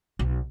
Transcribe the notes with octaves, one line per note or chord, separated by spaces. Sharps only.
B1